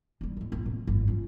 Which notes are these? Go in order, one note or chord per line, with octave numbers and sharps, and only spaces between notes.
G3 D#4
A2 G#3
A#1 C4
A2
G#1 F#2
C#4 F4